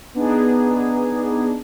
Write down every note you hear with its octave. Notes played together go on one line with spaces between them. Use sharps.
B3 D4 D#4 G#4